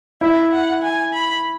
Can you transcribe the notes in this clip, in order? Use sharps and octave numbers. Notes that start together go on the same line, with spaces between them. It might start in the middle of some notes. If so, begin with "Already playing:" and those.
E4 E5
F#5
G#5
B5